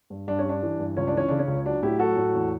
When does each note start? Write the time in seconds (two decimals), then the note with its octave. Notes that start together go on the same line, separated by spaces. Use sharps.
0.10 G2
0.28 G2 D4
0.39 C#4
0.45 G3 D4
0.63 E3
0.80 G2
0.97 C#2 C#4
1.07 D4
1.13 E3 C#4
1.28 C#3 D4
1.39 C#4
1.48 C#2
1.65 F#3 D4
1.82 A2 E4 G4
1.99 F#3 F#4 A4
2.17 A2
2.34 E2